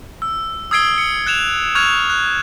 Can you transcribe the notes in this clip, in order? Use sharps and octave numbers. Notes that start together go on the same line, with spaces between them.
E6
D#6 E6 G#6 C7 D7 G7
C#7
F#6 G#6 E7 F7
C#6 F6 F#6 G#6 F7
F#6